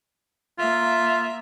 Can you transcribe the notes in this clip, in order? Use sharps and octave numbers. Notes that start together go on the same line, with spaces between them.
A#3 F4 E5